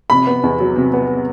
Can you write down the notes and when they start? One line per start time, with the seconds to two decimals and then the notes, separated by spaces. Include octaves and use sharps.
0.10 C3 B5
0.27 B3
0.44 E2
0.60 F#3
0.76 C3
0.94 B3